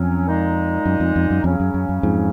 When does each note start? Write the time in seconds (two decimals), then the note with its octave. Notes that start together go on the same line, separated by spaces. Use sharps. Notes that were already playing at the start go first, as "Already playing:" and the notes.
Already playing: F2 F#3 C#4
0.27 A#2 G#3 D#4
0.86 F#2
1.00 F2
1.16 F2
1.30 F#2
1.44 F2 C#3 F#3 C#4
1.60 F#2
1.74 F#2
1.89 F#2
2.03 F2 G#2